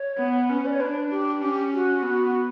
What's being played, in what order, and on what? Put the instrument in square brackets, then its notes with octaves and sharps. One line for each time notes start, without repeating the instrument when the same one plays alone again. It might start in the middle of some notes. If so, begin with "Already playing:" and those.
Already playing: [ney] C#5
[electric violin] B3
[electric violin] C#4 [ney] B4
[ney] D5
C#5
[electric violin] D4 [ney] B4
[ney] G4
[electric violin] C#4 [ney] G4
[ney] F#4
[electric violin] B3